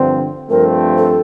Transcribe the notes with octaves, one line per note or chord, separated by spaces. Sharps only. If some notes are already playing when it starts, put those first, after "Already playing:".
Already playing: G2 D3 F3 C4
G2 F3 A3 C4 A#4
A4